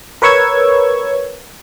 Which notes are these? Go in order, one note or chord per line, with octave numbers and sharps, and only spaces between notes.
A#4 B4 C#5 C#6 E6 G#6